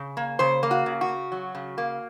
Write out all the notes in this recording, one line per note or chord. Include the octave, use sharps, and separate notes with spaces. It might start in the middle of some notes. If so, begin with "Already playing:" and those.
Already playing: C#3
A#3
C#3 C5
A#3
F#4
C#3
F#4
C#3
F#3
C#3
A#3